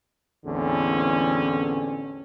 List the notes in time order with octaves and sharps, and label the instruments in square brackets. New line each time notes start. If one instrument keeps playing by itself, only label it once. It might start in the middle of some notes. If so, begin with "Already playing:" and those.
[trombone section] A1 E2 D3 A3 C4 C#4